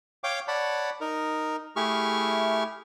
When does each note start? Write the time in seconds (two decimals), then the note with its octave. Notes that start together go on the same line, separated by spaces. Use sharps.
0.24 C#5 F5 G5 D6
0.48 C#5 D5 F#5 A5 B5
1.01 D#4 A#4
1.76 A3 E4 G4 G#4 C#6 F6